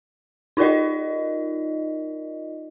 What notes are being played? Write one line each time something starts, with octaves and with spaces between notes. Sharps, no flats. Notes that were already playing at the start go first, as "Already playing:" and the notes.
D#4 F4 A#4 D5 D#5